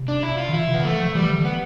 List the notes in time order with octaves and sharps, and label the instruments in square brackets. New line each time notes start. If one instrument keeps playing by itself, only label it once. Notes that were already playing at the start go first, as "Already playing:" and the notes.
Already playing: [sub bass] C3
[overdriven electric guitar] D4
E4
F4
[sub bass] D3
[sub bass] E3 [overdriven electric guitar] E4
[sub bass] C3
[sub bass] D3 [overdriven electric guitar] B3
[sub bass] E3 [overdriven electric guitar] A3
[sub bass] F3
[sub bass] E3 [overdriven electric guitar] G3
[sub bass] D3
[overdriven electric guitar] B3